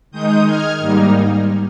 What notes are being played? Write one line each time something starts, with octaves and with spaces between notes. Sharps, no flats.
D#3 G#3 D#4 D#6 G6
F6 G#6
G#2 G3 A#3 D#4